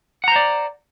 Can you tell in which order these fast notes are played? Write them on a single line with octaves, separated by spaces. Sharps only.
F#5 A#5 C5 D5